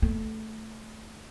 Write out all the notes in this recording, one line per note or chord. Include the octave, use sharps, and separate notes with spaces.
A3